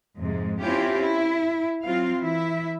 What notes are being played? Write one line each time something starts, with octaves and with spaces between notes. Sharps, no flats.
F2 G#2 C3 G#3
C4 C#4 E4 F4 G4
E4
F#3 C4 F4 F5
E3 E4 E5